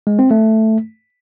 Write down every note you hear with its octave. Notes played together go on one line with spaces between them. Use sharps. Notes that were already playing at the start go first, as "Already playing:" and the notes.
G#3
C4
A3